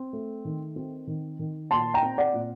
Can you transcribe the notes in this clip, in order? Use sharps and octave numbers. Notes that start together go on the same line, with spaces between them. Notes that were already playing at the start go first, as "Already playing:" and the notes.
Already playing: C4
A3
D#3
C4
D#3
D#3
A#2 A5 C6
G5 A#5
C4
D5 F#5
A#2